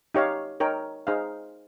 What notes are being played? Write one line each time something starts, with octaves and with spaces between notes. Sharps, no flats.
D#4 G4 C#5 F5
D#4 A#4 C#5 G5
D#4 G#4 C5 F5